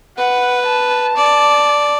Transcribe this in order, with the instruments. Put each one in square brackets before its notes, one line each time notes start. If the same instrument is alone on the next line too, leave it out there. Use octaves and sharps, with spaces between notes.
[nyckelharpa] B4 [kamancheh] F#5
[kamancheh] A5
[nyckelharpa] D5